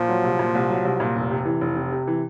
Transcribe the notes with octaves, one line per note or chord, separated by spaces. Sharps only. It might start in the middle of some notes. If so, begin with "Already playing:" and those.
Already playing: A#2 F3
F#3
C2
A#2
C2
F#3
C2
A#2
F1
C3
E3
F1
C3
C3
E3